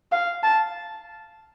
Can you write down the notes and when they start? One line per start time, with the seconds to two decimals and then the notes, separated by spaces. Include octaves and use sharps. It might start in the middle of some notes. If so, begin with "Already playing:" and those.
0.12 F5
0.43 A5